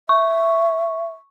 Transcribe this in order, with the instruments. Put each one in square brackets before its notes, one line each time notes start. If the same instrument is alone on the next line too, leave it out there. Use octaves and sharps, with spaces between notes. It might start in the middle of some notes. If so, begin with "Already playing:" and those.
[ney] E5 [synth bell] C#6